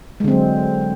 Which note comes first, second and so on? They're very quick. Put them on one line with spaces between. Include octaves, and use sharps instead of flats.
G#3 D3 C4 F#3